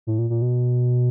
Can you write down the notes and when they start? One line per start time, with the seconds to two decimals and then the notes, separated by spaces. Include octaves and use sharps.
0.07 A2
0.19 A#2
0.30 A#2
0.42 B2